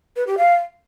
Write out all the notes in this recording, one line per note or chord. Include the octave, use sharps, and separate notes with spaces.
B4
G4
F5